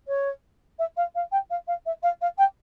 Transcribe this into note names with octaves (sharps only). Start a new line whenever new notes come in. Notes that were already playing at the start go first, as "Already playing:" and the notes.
C#5
E5
F5
F5
G5
F5
F5
E5
F5
F5
G5